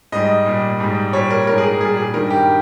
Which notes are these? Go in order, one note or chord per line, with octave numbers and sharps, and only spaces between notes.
G#2 G3 D#5
A#2 G3
G#2 G3
A#2 G3 C#5
A#4
G#2 G3 A#4
G#4
A#4
A#2 G3 G#4
G#4
G2 D#3 G3 A#4
G4